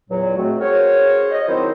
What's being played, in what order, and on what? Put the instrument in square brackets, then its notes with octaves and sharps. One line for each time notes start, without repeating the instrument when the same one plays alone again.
[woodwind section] E2 A#2 F#3
F#3 G#3 A3 C4 F#4
C#4 F#4 G#4 A#4 C5 C#5
D#5
D#3 F#3 C4 E4 C5